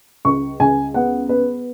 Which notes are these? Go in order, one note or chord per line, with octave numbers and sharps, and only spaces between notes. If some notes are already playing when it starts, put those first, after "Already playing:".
C#2 C#6
C#2 G#5
B3 F#5
B3 B4